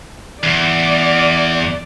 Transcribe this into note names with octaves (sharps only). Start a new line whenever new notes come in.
E2 D5